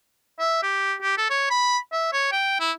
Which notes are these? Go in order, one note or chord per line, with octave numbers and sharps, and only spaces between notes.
E5
G4
G4
A4
C#5
B5
E5
C#5
G5
E4